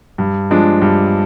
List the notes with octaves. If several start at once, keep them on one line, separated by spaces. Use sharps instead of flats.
G2
F3 G#3 D4
G2